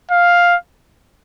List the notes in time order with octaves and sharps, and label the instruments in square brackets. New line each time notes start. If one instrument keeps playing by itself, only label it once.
[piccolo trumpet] F5